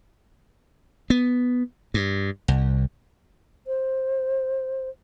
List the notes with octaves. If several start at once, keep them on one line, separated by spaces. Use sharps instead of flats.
B3
G2
C2
C5